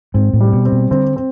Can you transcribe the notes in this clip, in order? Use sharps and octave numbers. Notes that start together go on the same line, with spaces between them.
G#2 C4
A2
G3
B2
C4
B2
D3 C4
C4